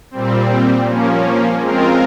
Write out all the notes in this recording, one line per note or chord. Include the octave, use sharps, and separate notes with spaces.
A#2 G3 C4
F3 A#3 C#4
G#3 C4 F4 A#4